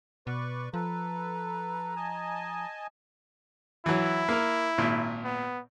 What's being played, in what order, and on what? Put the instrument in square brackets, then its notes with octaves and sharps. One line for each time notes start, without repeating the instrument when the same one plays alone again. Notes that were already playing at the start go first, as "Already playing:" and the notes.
[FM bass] B2 [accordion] B4 D5 C#6
[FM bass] F3 [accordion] A4 B4 [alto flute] A#5
[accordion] D#5 G#5 A5
[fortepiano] E3 F#3 [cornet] E4
[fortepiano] A#3 A#4
G#1 A#2
[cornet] B3